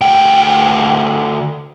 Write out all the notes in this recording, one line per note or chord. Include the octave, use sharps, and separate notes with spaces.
D2 G5